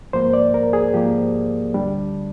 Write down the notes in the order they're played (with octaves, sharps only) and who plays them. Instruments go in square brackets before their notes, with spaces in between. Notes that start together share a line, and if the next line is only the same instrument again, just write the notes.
[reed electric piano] G#2 F3 A#3 C5
D5
A#4
G#4
G#2 F3 A#3 G4
D2 D3 G3 D4